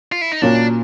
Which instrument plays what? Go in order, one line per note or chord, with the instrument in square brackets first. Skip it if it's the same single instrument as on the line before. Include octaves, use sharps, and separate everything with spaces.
[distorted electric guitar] F4
E4
D#4
[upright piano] A#2 F#3 A#3 C#4 [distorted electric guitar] D4